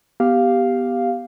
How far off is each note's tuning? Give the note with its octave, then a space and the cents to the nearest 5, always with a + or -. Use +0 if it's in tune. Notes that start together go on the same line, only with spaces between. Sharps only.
B3 +0 G4 +0 F5 +0